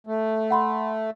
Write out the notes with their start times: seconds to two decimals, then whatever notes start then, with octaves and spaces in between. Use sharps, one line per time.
0.07 A3
0.51 F#5 B5 C6